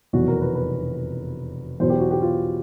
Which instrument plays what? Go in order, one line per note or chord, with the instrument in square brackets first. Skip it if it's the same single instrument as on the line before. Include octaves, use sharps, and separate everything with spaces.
[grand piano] F1 E2 B2 F#3 F#4
A#4
B4
B4
E2 B2 F#3 C5
G4
F#4
G4
F4